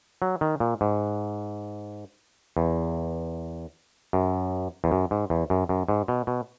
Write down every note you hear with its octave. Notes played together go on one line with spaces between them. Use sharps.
F#3
D#3
A#2
G#2
E2
F#2
E2
F#2
G#2
E2
F#2
F#2
G#2
B2
B2